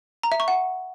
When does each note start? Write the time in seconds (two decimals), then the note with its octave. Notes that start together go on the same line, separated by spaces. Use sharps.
0.23 A#5
0.32 E5
0.40 C#6
0.48 F#5